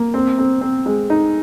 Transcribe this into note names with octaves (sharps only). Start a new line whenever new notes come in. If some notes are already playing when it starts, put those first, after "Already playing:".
Already playing: A#3
C4
C4
C4
G#3
D#4